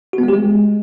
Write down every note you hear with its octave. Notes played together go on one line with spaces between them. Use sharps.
F#4
B3
G#3
G4
G#3